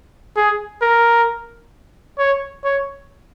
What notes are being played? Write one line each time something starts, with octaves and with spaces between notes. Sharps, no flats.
G#4
A#4
C#5
C#5